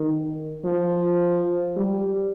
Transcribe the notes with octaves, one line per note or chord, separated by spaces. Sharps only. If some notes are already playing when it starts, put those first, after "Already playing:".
Already playing: D#3
F3
G3